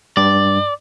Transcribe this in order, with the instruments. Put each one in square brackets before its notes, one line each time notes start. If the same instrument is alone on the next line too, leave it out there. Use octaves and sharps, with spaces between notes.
[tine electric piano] G2 [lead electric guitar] D5